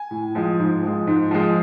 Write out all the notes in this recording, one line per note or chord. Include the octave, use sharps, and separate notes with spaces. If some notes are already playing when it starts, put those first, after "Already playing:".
Already playing: G#5
A2
F3 G#3
G#2
F3 G#3
G#2
F3 G#3